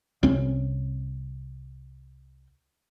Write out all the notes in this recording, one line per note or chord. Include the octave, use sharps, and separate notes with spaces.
C2 C4 C#4